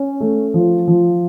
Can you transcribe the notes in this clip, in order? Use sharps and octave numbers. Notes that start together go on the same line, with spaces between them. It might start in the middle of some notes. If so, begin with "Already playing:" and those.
Already playing: C#4
A3
F3
F3